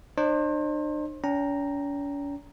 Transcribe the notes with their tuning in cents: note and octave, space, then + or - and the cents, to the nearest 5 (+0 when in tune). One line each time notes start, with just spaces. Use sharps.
D4 +45 C5 +35
C#4 +45 G5 +0 A#5 +0